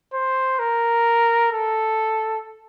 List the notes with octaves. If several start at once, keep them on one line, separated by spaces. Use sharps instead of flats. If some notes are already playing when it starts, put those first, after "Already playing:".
C5
A#4
A4